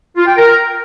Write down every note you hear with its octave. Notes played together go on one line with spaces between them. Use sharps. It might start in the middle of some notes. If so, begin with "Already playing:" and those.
F4
G5
A#4